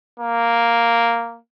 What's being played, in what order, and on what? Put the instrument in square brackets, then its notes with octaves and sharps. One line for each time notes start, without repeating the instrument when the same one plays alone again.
[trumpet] A#3